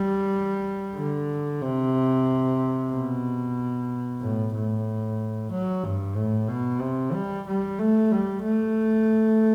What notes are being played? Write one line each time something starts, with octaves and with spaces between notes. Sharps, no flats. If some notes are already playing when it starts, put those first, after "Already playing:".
Already playing: G3
D3
C3
B2
A2
A2
F#3
G2
A2
B2
C3
G3
G3
A3
G3
A3